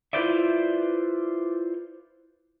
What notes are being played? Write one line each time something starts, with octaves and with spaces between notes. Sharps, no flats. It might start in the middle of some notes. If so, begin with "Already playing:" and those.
E4 F4 B4 C5 D5 E5